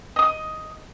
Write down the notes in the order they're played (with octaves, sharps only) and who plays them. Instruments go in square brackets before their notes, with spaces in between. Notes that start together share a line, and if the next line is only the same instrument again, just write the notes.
[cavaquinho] D#5 D#6